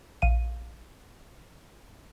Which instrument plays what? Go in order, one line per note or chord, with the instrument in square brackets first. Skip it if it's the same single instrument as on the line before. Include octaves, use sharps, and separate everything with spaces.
[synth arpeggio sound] A#1 F5 D#7